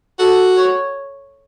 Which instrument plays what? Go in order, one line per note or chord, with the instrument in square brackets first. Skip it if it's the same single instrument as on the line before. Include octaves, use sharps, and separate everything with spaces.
[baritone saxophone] F#4 [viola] A4
[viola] C#5